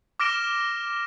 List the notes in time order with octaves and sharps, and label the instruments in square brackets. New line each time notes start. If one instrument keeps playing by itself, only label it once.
[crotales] D6 F6 A#6 D7 E7 G7